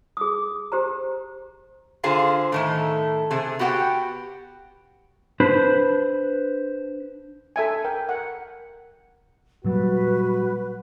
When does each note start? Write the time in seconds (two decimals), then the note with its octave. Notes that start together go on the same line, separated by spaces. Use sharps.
0.17 G#4 D#6
0.72 G4 C5 A#5
2.03 D3 F4 G#4 C5 F5 A#5
2.52 A2 D#3 A3
3.31 C3 G#4
3.59 B3 F#4 G4 F#5 G5
5.40 D4 B4 C5 B5
7.56 A4 E5 G#5
7.85 A#4 G5
8.09 F#5
9.64 A#2 F#3 G3 F#4 B4